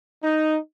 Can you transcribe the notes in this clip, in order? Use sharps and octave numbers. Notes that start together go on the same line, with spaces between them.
D#4